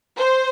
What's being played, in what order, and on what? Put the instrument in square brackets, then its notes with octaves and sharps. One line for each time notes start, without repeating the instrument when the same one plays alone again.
[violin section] C5